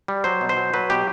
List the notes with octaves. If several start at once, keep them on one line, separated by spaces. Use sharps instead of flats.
G3
F#3 C5
B2
C5
F#3
F#3 B4
B2 G4